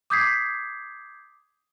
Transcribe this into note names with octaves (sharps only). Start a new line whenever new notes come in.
D6 D#6 G6 G#6 B6 C7